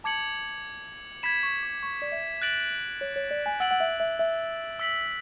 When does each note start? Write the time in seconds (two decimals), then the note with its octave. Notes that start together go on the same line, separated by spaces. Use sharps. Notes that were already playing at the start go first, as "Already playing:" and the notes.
0.04 A5 D6 G#6 C#7 F#7
1.23 B5 G#6 B6 E7
1.43 C#6
1.63 D6
1.83 C#6
2.02 D5
2.12 E5
2.42 F#6 A6 D7 F#7
3.01 C#5
3.16 C#5
3.31 D5
3.46 G#5
3.60 F#5 E6 A6 D7 F#7
3.71 F#5
3.80 E5
4.00 E5
4.19 E5
4.79 E6 B6 F#7